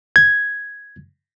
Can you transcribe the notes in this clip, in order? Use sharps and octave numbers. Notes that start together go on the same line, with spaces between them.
G#6